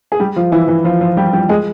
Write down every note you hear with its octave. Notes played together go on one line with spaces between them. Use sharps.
G#4
G3 G4
F3 F4
E3 E4
E3 E4
F3 F4
F3 F4
G3 G4
G3 G4
G#3 G#4